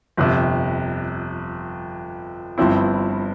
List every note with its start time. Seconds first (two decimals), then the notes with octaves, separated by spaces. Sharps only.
0.17 G1 F2 C3
2.58 G1 G2 F3 C4 E4